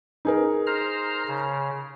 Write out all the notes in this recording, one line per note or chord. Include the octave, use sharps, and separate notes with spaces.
D#4 G#4 A#4
C5 A#5 F6
C#3